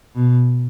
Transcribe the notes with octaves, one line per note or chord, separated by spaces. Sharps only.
B2